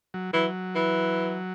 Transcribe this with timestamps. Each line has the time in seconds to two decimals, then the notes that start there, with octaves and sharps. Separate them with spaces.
0.14 F#3
0.34 E3 F#3
0.75 E3